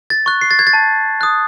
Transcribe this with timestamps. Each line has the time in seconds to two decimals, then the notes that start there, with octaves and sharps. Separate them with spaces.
0.10 A6
0.26 C#6 F#6
0.41 C7
0.51 A6
0.59 G#6
0.67 A6
0.73 A5
1.21 D#6 F#6